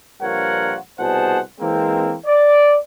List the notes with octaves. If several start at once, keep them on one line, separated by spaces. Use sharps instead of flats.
A#1 G2 F4 A#4 C#5 F#5
C2 B2 G#4 C5 F#5 A5
E3 G#3 A#3 C4
D5